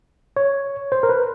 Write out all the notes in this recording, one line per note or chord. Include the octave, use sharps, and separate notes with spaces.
C#5
C5
A#4
B4